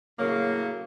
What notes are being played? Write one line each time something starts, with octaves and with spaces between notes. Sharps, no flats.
A2 C#3 F#3 A#3